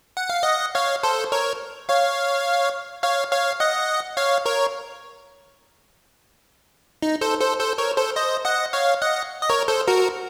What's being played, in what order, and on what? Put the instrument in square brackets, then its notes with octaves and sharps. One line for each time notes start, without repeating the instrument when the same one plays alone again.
[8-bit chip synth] F#5
F5
D#5 F#5
C#5 F5
A4 C5
A#4 C#5
C#5 F5
C#5 F5
C#5 F5
D#5 F#5
C#5 F5
A#4 C#5
D#4
A4 C5
A4 C5
A4 C5
A#4 C#5
A4 C5
C5 D#5
D#5 F#5
C#5 F5
D#5 F#5
D#5
A#4 C#5
A4 C5
F#4 A#4